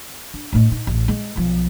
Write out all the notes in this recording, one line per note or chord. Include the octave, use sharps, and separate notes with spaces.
D4
A2 D#4
D#4
A1
G#3
B1 F3